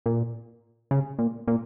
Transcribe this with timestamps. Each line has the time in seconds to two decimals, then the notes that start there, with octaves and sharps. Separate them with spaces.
0.06 A#2
0.91 C#3
1.19 A#2
1.47 A#2